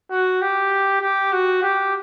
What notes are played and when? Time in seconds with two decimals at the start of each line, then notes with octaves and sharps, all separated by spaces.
0.11 F#4
0.41 G4
1.01 G4
1.32 F#4
1.62 G4